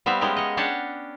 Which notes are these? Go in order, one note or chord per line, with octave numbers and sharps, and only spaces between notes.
G3 B3 C4 E5 F5
G#3 B3 C#4 G4 A#4
C#5 D#5
C#4 D4 G4 C#5 F#5 A5